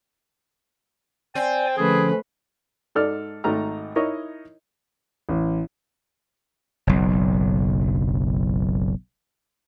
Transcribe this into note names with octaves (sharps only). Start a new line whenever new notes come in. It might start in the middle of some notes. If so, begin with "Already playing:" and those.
C4 D5 G5 G#5
D3 F3 A3 C#4 G#4 B4
G#2 A4 D5 F6
G#1 G#2 A3 A#5 F6
D#4 E4 A#4 C#5 D#5
A1
F#1 B1